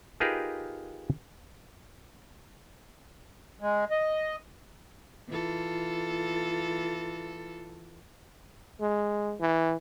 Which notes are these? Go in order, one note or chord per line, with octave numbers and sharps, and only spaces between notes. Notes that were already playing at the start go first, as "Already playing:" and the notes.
D#4 F4 G4 G#4 A#4 B4
G#3
D#5
E3 F4 A4
G#3
E3